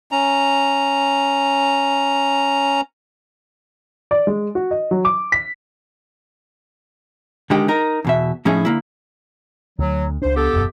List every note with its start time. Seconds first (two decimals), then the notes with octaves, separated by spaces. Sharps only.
0.12 C#4 A#5
4.11 D5
4.27 G#3
4.55 F#4
4.71 D#5
4.91 F#3
5.05 D6
5.32 B6
7.50 D3 D#3 G#3 G4
7.68 D#4 A#4
8.05 E2 B2 E5
8.45 A2 F3 C#4 D#4 E4 G#4
8.65 D3 A#3 E4
9.79 D2 F#3
10.22 C#2 D4 C5
10.35 B3 G4 A4
10.54 E1 F#2